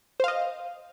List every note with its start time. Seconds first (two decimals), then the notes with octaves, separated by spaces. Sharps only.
0.20 C5
0.24 F5
0.28 D#5